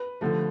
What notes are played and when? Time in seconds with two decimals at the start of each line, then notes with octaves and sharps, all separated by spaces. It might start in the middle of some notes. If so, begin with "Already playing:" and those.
Already playing: B4
0.21 D3 F3 A3